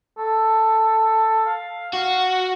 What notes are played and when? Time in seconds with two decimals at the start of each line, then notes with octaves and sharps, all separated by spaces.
0.18 A4
1.46 F5
1.93 F#4